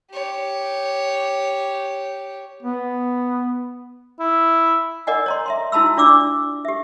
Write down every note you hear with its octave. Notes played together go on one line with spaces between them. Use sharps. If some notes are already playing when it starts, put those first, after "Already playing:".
G4 C#5
B3
E4
A#4 D5 D#5 F#5 G#5
C#5 A#5 C6
E5 A#5 C6
E4 F#4 A5 B5 E6
D4 F4 D5 D6 E6
G4 E5